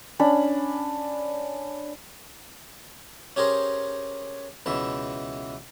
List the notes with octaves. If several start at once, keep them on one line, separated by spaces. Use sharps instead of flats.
C#4 D4 B5
C#4 G4 G#4 A#4 C5
C#2 B2 E3 E5